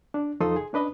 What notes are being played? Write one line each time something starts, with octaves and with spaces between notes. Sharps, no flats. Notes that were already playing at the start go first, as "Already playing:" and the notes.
D4
E2 F3 D#4 A4 C6 D#6
G#4
C#4 D4 B4 D#5